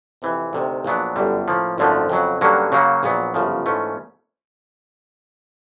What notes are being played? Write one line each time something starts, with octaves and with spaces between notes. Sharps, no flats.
F2 C3 E3
D2 C3 D#3
A#1 A#2 F#3 B3 D4
G1 F#2 D3 G3
A2 F3 A#3 C#4
G#1 F#2 D3 F3 A3
F2 C#3 F#3
G2 D3 F#3 A#3 C#4
C#3 F#3 A#3 C#4
A#1 A#2 F#3 B3
G1 F#2 C#3 F3
G#2 E3 A3 C#4 F4